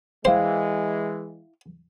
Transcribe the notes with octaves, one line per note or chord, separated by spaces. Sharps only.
E3 G#3 E4 C5 F5 G5